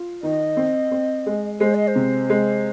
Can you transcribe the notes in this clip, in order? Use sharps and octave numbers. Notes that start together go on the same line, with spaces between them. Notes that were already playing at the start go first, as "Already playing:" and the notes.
Already playing: F4
D#3 D#5
C4
C4
G#3
G#3 C5
D#5
C5
C3
G#3